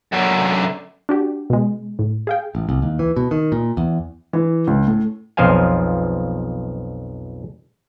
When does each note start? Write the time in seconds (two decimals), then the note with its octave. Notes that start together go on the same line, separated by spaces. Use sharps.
0.12 F#2 D3
1.09 D4 F#4 G4
1.50 B2 G#3
1.99 A2
2.27 G#4 F5 G5
2.55 A1
2.69 C2
2.82 D#2
2.99 E3
3.17 B2
3.31 D#3
3.52 A#2
3.77 E2
4.33 E3
4.67 C#2
4.88 A2
5.37 B1 F2 F3 C5 F5 G#5